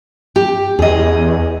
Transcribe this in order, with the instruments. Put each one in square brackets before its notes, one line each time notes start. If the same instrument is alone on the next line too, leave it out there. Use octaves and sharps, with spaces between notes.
[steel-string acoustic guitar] G4
[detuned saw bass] E2 [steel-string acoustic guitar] G#4 D#5